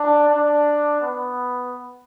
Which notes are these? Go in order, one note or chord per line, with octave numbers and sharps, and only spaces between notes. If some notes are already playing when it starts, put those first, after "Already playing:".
Already playing: D4
D4
B3